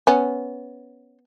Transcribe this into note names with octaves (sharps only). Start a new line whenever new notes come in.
B3 C#4